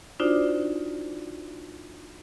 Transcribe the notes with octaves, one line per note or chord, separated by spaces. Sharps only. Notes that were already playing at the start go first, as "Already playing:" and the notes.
D4 D#4 F4 F#4 C5 D5